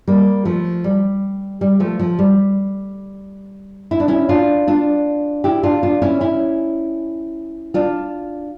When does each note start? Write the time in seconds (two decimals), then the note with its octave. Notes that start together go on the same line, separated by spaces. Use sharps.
0.07 G3 A#3
0.45 F3 A3
0.84 G3
1.61 G3
1.80 F3 A3
1.99 F3
2.19 G3
3.91 E4
4.00 D4
4.08 C#4 E4
4.29 D4 F4
4.68 D4 F4
5.44 E4 G4
5.63 D4 F4
5.83 D4 F4
6.02 C#4 E4
6.20 C#4 E4
7.74 D4 F4